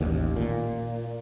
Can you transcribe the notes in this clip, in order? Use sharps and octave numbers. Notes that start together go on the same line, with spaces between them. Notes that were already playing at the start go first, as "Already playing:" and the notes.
A1 D#2
A#2